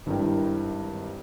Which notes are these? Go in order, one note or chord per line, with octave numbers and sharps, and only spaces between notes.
G#1 G2 E3 A#4 G5